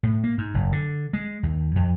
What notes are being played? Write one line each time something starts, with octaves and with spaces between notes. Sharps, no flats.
A2
A#3
G#2
F#1
D3
G#3
D#2
F2